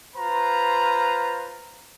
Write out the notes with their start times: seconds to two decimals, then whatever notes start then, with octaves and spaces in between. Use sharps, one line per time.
0.15 F4 B4 C5 A#5